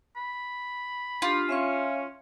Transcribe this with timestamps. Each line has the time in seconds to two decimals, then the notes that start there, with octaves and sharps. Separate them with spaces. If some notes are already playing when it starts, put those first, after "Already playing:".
0.16 B5
1.22 D4 F4 G4
1.49 C#4 E5 F5 C#6